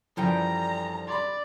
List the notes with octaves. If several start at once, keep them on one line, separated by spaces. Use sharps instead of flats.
F#2 D3 E3 F3 G3 G5 A#5
D5 B5 C6